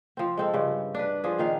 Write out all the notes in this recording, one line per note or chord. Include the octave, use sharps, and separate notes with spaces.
F3 C4
G#3 C4 A4
G2 C#3
D4 B4
F3 D4 G#4
A#2 D#3 F5